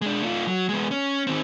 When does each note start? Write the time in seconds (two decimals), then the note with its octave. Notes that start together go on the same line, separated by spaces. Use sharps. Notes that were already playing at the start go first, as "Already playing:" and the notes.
0.01 G#3 D4
0.23 A3 F4
0.47 F#3
0.69 G#3 B3
0.91 C#4
1.27 D#3 C4